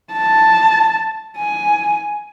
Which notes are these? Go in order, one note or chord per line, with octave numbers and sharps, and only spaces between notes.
A5
G#5